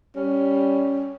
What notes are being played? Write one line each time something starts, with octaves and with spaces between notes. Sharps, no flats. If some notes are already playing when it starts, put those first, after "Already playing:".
G3 C#4